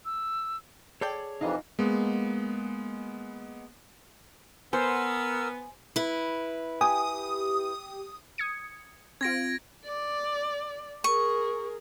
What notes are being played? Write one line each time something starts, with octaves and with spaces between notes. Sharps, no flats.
E6
G#4 A4 C#5 D5 G5
F2 C3 E3 D#4 F4 D#5
G#3 A#3 B3
B3 A#4 C5 G#5 E6
E4 B4
G4 G#5 D#6
D#6 G#6 C#7
C4 F4 G#6 A#6 D7
D5
G#4 A#4 C#6